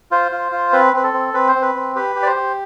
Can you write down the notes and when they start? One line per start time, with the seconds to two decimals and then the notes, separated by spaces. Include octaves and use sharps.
0.11 F4 C5
0.32 F4
0.52 F4
0.73 C4 B4
0.94 C4 B4
1.03 A4
1.14 C4
1.34 C4 B4
1.48 C5
1.55 C4
1.62 B4
1.75 C4
1.96 G4 B4
2.16 G4
2.23 D5
2.26 C5
2.36 G4